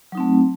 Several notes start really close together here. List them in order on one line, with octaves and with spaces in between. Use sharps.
F#3 D#4 C4 A3